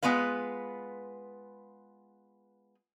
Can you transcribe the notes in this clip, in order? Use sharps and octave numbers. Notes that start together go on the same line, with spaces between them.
G#3 B3 F4 B4 F5